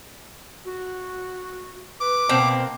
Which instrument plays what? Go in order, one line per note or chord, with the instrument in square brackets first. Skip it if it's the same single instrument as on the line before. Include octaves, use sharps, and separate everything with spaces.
[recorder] F#4
[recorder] B4 [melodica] D6
[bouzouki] B2 C4 [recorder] A#3